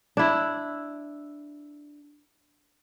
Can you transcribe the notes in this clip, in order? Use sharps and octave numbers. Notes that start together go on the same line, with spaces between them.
D4 E4